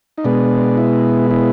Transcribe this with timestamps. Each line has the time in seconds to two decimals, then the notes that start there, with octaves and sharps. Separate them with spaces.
0.18 D#4
0.25 B2 G#3 B3 D4
0.77 E4
1.31 E4